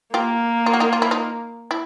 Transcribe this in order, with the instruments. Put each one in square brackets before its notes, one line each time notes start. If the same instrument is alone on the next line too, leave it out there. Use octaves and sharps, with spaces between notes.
[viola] A#3 [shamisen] F4 G4
[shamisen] F4
F#4
D#4 F4
F4
E4
D#4 F4
E4